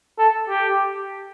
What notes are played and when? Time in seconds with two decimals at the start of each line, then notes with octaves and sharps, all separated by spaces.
0.18 A4
0.49 G4